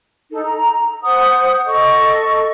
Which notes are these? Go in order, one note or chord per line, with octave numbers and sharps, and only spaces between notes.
D#4 A4
A#5
C5 F#5 D#6
A4 D#5 C#6